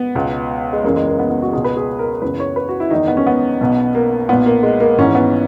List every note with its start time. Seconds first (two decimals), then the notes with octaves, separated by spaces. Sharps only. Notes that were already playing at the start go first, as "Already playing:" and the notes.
Already playing: B3
0.15 C#2 B2
0.73 G#3
0.84 F#1 E2 C#3 E3 A#3
0.96 G#3
1.08 A#3
1.19 B3
1.30 B3
1.42 F#4
1.53 C#2 B2 G#4
1.64 B4
1.77 G#4
1.99 A#4
2.22 F#1 E2 C#3 B4
2.40 C#5
2.56 B4
2.69 F#4
2.80 E4
2.91 F#1 E2 D#3 D#4
3.08 B3
3.17 C#4
3.27 B3
3.61 B1 B2
3.95 A#3
4.29 B1 A#2 B3
4.46 A#3
4.63 G#3
4.80 A#3
4.98 G#1 G#2 E3 C#4
5.15 B3